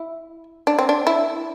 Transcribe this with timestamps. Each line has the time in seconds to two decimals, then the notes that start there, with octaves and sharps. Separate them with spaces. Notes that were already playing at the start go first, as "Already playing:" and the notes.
Already playing: E4
0.67 D4
0.79 C4
0.89 D4
1.07 E4